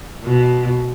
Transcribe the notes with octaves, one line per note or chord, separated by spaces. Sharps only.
B2